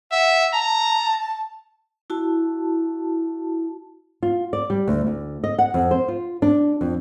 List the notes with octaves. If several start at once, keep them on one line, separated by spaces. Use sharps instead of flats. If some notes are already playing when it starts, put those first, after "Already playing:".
E5 F#5
A5 A#5
E4 F#4 A5
F4
D5
G3
D2
D2
D#5
F#5
F2
C5
F4
D4
F2